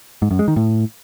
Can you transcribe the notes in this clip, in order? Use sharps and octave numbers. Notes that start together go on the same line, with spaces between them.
G#2
F#2
G#3
D#3
A2